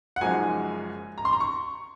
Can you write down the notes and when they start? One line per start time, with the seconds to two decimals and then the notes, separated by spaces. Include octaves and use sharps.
0.16 F#5
0.21 F#1 F#2 F3 G#3 D#4 G#5
1.18 A#5
1.25 C6
1.33 A#5
1.40 C#6